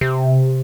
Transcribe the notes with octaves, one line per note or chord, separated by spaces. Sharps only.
C3